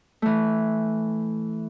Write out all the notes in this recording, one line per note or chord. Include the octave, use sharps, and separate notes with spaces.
E3 A3